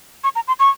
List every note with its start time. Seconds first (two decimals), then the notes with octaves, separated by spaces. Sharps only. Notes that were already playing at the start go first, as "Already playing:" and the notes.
0.24 C#6
0.35 A#5
0.48 C6
0.60 C#6